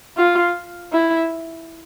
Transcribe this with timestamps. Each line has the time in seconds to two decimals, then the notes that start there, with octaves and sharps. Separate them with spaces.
0.17 F4
0.92 E4